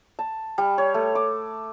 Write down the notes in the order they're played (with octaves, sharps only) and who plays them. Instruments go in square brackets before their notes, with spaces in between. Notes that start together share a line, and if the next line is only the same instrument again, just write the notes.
[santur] A5
G3
C#5
A3
D6